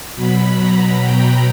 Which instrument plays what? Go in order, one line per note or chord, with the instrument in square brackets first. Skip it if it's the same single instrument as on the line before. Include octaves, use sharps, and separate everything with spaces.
[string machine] B2 F#3 B5
A#5
G5